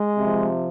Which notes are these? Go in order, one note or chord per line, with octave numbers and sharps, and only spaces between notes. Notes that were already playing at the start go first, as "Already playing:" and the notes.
Already playing: G#3
C3 F3